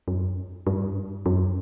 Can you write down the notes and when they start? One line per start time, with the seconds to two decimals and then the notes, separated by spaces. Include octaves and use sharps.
0.08 F#2
0.67 G2
1.26 F#2